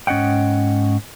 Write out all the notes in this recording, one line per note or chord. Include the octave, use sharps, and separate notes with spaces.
G#2 C#4 D#5 F#5 G5